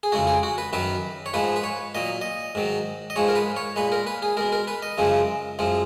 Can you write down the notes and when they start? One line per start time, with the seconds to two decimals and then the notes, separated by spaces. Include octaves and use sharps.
0.03 G#4
0.12 F2 C#3 G#3 F#4
0.27 G#4
0.43 F#4
0.58 B4
0.73 F#2 D#3 F#3 B4
1.26 C#5
1.34 G#2 F3 G#3 B4
1.56 B4
1.64 C#5
1.95 A#2 F#3 D#5
2.21 D#5
2.55 G#2 D#3 F#3
3.10 D#5
3.16 G#2 F3 G#3 C#5
3.28 A#4
3.35 B4
3.56 C#5
3.76 A#2 G#3 B4
3.92 A#4
4.07 B4
4.22 G#4
4.37 B2 G#3 A#4
4.52 A#4
4.68 B4
4.82 D#5
4.98 F#2 C#3 F3 G#3
5.59 F#2 F3 G#3